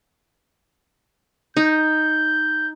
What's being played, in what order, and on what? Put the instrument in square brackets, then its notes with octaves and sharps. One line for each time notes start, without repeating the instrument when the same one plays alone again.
[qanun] D#4 [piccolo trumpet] G6